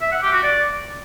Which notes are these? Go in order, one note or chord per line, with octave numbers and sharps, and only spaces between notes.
E5
F#5
G4
F#4
D5